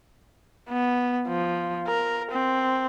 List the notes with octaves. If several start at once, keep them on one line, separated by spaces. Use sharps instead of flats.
B3
F3
A#4
C4